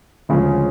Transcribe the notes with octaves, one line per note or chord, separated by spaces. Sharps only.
D2 C#3 F3 G#3 C#4